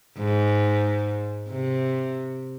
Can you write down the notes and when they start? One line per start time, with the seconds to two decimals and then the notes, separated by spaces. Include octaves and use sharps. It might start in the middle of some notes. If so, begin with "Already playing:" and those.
0.18 G#2
1.50 C3